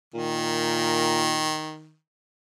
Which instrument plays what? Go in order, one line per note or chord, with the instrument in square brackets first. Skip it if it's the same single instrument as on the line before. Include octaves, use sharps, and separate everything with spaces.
[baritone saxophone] A#2 [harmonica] D#3